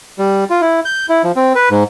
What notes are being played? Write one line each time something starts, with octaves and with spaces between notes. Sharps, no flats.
G3
F4
E4
G6
E4
F3
C4
B4
G#2